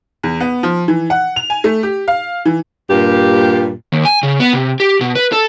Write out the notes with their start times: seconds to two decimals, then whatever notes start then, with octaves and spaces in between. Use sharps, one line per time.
0.23 E2
0.40 B3
0.63 F3
0.88 E3
1.10 F#5
1.36 F7
1.50 G#5
1.64 A3
1.83 G4
2.08 F5
2.45 E3
2.90 G2 A#2 A#3 G4
3.93 D#2
4.05 G#5
4.23 C#3
4.40 B3
4.53 C3
4.80 G4
5.01 B2
5.15 B4
5.32 A4